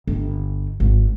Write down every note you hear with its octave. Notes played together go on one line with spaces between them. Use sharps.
G1
G#1